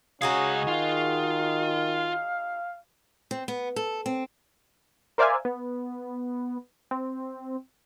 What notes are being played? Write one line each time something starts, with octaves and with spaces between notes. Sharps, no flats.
C#2 C#4 D#4 F#4 G#4 F5
D#3 F4 F5
C4
B3
A4
C4
A#4 C5 D5 E5 F5 G#5
B3
C4